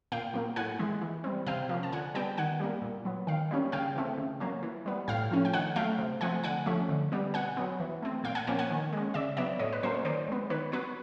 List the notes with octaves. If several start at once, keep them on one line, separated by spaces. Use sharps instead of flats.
A#2 F5 G5
F#3 A#3
A2 F#5 G#5
E3 G#3
E3
G3 C4
C3 F5 G5
F3 A#3 C#4
A5
D3 F#5 G#5
G3 B3 G5 A5
D#3 F#5 G#5
G3 A#3
A#2
F#3 B3
D#3 F5 G5
G3 A#3 C#4
C#3 F5 G5
E3 A3 C4
C#3
F#3 A#3 C#4
E3
G3 B3
A2 F5 G5
F3 A3 C#4
G5
D#3 F#5 G#5
F#3 A3 F5 G5
C3
F3 A3 C4 F#5 G#5
D3 F#5 G#5
F3 A3 C#4
D3
G3 B3
B2 F#5 G#5
F#3 B3
E3
A3 C4
A#2 F5 G5
F#5 G#5
F3 A#3 C#4 G5 A5
F#5 G#5
D#3
G#3 C#4
C#3 D5 E5
F#3 B3 D5 E5
A2 C#5 D#5
B4
F#3 A#3 C#4 C5
C#5
D#3 C5 D5
G#3 B3
D#3 B4 C#5
F#3 B3 B4 C#5